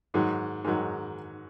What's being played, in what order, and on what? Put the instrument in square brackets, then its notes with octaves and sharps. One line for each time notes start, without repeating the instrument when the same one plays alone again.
[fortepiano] G#2 D#3 F#3
G#2 D#3 F#3